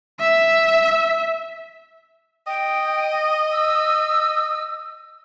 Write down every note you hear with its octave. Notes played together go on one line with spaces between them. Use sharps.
E5
D#5 G5
E6